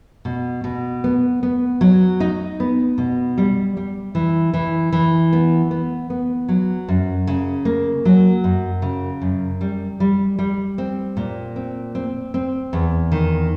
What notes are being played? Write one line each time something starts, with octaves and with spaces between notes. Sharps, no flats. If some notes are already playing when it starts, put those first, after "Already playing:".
B2
B2
B3
B3
F#3
D#4
B3
B2
G3
G3
E3
E3
E3
B3
B3
B3
F#3
F#2
C#3
A#3
F#3
F#2
C#3
F#2
G3
G3
G3
C4
A#2
C4
C4
C4
E2
D#3